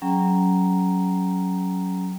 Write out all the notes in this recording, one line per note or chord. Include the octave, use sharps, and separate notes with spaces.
F#3 C#4 G#4 G5 A#5